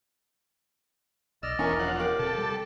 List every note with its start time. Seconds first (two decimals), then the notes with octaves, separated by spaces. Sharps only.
1.43 B1 D5 D#5 E6 F6
1.59 E1 E3 B3 C#4 D4 A#4 G#5 A#5
1.79 F3 C#5 F#5
2.00 G4 A#4 G5 D6
2.19 D#1 C3 A4
2.38 G3